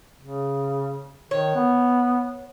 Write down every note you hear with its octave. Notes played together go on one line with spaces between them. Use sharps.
C#3
D#3 C#5
B3